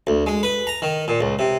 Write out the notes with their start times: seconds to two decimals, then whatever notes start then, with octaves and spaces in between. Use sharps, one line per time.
0.07 D2
0.26 G#3
0.43 B4
0.67 A#5
0.82 D#3
1.08 A#2
1.21 C#2
1.39 C3